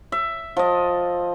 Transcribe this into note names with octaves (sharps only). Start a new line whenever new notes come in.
E5
F3 D#5